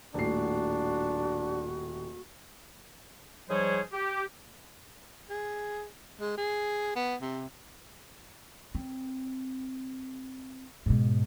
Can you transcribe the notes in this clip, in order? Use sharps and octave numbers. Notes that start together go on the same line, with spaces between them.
D#1 A2 D4 F#4 C7
G#2 F3 G3 G#4 C5 C#5
G4
G#4
G#3
G#4
B3
C3
C4
G#2 B2